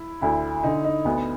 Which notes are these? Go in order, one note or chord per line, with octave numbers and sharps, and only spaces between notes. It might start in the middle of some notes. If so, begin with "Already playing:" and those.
Already playing: E4
D2 E4
D3 D#4
D#4
D2 B3